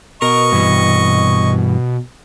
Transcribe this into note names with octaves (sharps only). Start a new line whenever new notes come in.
B2 A#4 D#5 C#6
G2 E3